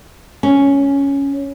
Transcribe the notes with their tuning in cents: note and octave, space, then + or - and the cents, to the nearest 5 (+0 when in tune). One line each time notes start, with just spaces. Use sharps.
C#4 +5